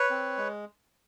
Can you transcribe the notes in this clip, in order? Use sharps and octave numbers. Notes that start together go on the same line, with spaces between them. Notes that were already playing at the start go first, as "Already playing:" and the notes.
Already playing: B4 C#5
C4
G#3